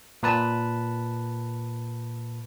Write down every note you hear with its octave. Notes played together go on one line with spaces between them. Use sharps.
A#2 B4 A5